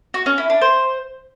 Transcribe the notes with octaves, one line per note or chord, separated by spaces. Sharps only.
F#4
C#4
E4
D4
C5